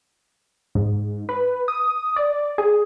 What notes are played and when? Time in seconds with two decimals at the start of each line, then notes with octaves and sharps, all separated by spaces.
0.75 G#2
1.29 B4
1.68 D#6
2.16 D5
2.58 G#4